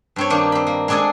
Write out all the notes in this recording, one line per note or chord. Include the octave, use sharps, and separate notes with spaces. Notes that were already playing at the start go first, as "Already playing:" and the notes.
G2 C4 C#5
D#3 A#3 D4 D#4
C4 B5
A#3
G#3 C4 D4 G#4 A4 G#5